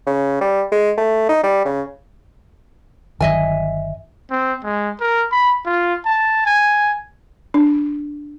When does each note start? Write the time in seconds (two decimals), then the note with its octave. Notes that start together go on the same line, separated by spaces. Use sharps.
0.07 C#3
0.41 G3
0.72 G#3
0.98 A3
1.29 D#4
1.44 G3
1.65 C#3
3.20 G1 D#3 F#3 D#5 E5 G#5
4.31 C4
4.64 G#3
5.00 A#4
5.32 B5
5.66 F4
6.05 A5
6.46 G#5
7.54 D4